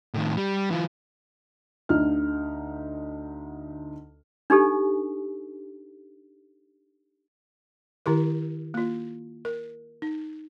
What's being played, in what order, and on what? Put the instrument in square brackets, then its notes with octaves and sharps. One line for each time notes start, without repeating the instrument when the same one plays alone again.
[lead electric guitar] A2 D#3
G3
E3 F4
[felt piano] D2 D3 D#4 F6
[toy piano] D4 D#4 G4 A4
[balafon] D#3 E4 G4 A#4
A#3 F4
A#4
D#4